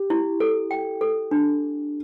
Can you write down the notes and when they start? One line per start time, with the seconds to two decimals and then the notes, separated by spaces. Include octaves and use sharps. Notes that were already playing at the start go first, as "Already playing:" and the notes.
Already playing: G4
0.10 E4
0.40 A4
0.71 G5
1.01 A4
1.31 D4